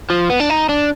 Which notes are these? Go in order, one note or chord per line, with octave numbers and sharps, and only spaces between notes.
F3
B3
D4
D#4
D4